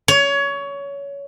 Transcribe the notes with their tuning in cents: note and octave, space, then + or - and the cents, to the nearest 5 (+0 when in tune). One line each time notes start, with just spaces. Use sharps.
C#5 +20